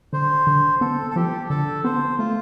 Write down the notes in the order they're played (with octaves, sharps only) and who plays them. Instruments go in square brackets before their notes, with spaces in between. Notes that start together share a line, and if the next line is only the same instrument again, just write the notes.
[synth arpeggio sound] D3 [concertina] C5
[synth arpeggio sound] D3
[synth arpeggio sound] B3 [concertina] A4
[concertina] A4
[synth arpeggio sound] F3 [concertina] G4
[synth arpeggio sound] D3 [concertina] A4
[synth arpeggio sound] B3 [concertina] C5
[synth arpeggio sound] A3 [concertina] F4